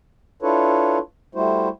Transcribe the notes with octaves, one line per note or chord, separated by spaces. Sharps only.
D4 E4 F4 A4 B4 C#5
G3 A3 E4 F#4 C5